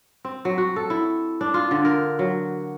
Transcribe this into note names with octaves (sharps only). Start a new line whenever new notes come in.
C4
F#3
F#4
A4
E4
D4
F4
D3
A#4
F#3